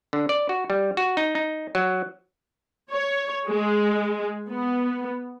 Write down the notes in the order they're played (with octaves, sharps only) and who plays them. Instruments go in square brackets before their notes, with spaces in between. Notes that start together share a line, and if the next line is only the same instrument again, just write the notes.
[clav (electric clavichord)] D3
D5
F#4
G3
F#4
D#4
D#4
F#3
[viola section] C#5
G#3
B3